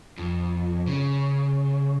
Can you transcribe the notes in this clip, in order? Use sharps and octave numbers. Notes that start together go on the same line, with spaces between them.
F2
C#3